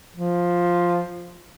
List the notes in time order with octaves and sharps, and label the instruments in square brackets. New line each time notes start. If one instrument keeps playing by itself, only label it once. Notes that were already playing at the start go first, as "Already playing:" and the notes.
[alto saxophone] F3